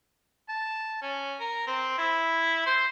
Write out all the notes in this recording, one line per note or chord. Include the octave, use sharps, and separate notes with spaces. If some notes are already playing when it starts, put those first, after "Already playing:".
A5
C#4
A#4
C4
E4
C5